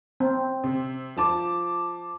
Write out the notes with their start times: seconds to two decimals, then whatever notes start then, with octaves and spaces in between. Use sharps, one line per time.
0.20 C4
0.64 C3
1.16 F3 A5 D6